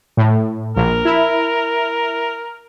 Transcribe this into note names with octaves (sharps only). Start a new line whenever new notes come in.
A2
A#1 A#4
E4